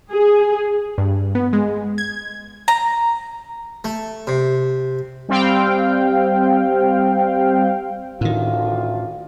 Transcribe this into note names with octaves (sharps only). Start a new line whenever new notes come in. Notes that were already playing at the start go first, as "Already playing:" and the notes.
G#4
G2
B3
G#3
G#6
A#5
A3
C3
G3 C4 F5 G5
A1 D2 A2 D#3 F4